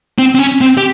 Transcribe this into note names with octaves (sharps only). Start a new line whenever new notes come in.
C4
C4
C#4
C4
G4